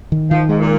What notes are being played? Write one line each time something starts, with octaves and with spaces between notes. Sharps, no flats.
D#3
D#3 F3
G#2 G#3
A#2